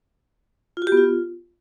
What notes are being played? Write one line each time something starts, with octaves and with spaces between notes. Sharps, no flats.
F4
F#4
G4
B3
F4